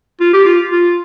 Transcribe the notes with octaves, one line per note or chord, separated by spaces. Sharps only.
F4
G4
F4
F4